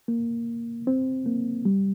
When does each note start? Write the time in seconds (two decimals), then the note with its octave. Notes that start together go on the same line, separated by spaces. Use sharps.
0.08 A#3
0.87 C4
1.26 A#3
1.65 G3